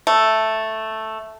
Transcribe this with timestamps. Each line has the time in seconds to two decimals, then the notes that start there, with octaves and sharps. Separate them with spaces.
0.07 A3